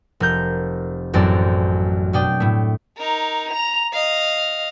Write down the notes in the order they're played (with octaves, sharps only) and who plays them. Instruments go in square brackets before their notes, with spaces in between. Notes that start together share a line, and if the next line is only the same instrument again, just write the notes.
[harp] F1 A#4 G6
A1 F#2 C4 A4 D5
B2 D4 D5 G5 D#6
A2 A3
[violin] D#4 A#4
A#5 F7
D#5 F5